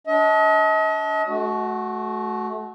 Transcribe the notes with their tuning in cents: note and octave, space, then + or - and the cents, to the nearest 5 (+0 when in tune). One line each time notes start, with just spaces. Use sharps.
D4 -25 D#5 +40
A3 -30 F#4 +0